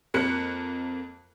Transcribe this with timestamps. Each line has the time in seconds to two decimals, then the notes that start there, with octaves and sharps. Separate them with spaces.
0.14 F2 A#3 F#6 C#7